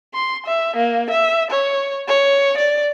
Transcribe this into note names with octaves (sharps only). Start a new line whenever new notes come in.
C6
E5
A#3
E5
C#5
C#5
D5